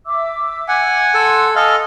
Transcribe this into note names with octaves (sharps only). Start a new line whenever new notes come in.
E5 D6 E6
F#5 G#5
A4 C6
A4 D#5 F5 G#5